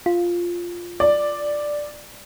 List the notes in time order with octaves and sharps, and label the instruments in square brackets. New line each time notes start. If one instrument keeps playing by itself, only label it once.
[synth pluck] F4
[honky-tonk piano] D5